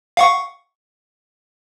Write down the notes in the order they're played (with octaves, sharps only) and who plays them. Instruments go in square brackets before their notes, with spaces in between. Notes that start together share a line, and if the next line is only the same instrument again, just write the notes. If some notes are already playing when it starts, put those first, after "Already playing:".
[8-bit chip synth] F5 F#5 C#6